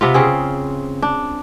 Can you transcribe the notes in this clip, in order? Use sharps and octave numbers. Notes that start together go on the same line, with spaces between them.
C3 B3 F4
C#3 C4 G#4
D4